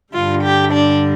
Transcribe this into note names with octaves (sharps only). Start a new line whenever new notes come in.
G2 D3 G3 F4
G4
D4